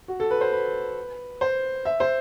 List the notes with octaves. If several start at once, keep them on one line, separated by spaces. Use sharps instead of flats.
F#4
A4
B4
C5
B4
C5
E5
C5